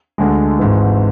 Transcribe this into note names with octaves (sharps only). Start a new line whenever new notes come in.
D2 D3 G#3
G#1 G#2 E3